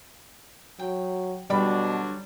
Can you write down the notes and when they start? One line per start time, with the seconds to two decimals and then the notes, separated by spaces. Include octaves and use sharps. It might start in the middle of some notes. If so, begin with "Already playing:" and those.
0.79 F#3 G5
1.50 B2 D3 F#3 G3 D4 B5 D6